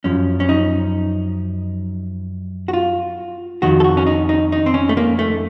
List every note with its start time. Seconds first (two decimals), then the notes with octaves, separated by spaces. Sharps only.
0.04 F#2 F3 C#4
0.40 C#4
0.49 D#4
2.68 F#4
2.73 F4
3.62 F2 D#3 F#4
3.80 A4
3.84 F#4
3.97 C#4
4.07 D#4
4.29 D#4
4.52 D#4
4.66 C4
4.74 C#4
4.89 A3
4.97 A#3
5.19 A3